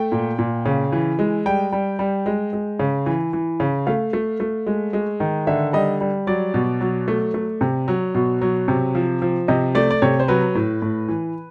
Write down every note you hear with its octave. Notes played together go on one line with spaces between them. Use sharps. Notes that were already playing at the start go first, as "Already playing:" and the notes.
Already playing: A3 G5
A#2
A#2
C#3
E3
G#3
G3 G5
G3
G3
G#3
G#3
C#3
E3
E3
C#3
A3 F5
A3
A3
G#3
G#3
D#3
D3 E5
G3 D#5
G3
F#3 D5
B2
F#3
A3
A3
C3
F#3
B2
F#3
C3
F3
F3
C3 D#5
A3 D5
D5
C3 C#5
C5
F#3 B4
A2
A2
E3